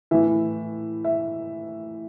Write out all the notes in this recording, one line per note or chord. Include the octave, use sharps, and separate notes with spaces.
A2 E3 E5
E5